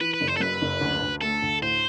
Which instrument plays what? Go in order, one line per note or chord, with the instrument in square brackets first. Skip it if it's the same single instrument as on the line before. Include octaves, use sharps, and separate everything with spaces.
[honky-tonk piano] E3 [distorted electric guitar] B4
[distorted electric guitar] B4
[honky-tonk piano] F#1
[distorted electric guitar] C5
A4
[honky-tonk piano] F#2 [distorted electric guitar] B4
[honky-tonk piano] F#1
D2
D2
[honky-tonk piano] A3 [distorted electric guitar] A4
[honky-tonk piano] D2
[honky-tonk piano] A2 [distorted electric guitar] C5